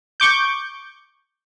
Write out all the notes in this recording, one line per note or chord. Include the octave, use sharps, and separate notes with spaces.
C#6 D6 G6